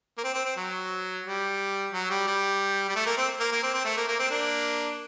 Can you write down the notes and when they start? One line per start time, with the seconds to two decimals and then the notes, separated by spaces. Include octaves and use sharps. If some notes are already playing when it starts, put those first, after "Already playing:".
0.18 A#3
0.23 C4
0.34 C4
0.45 C4
0.57 F#3
1.26 G3
1.92 F#3
2.10 G3
2.27 G3
2.89 G3
2.95 A3
3.06 A#3
3.17 C4
3.40 A#3
3.52 A#3
3.63 C4
3.74 C4
3.85 A3
3.97 A#3
4.08 A#3
4.19 C4
4.30 A#3 D4